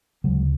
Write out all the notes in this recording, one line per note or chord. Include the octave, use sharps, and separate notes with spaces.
D2 C#3 F#3 G#3